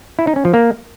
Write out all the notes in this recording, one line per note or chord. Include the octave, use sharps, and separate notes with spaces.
E4
D#4
C#4
F3
A#3